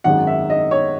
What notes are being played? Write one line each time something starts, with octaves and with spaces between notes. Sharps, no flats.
G#1 F#2 D#3 G#3 F#5
E5
D#5
C#5